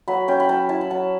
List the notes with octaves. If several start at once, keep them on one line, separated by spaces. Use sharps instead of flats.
F#3 B5
C#4 G5
B5
F#3 A5
E4 A5
B5
F#3 A5